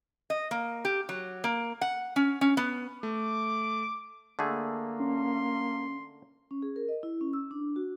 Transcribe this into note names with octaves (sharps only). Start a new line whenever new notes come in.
D#5
A#3
G4
F#3
A#3
F#5
C#4
C#4
B3
A3 D6
D3 A3 A#3 G#4
C#4 C6
C#4
G#4
A#4
D#5
E4
C#4
E6
D4
F#4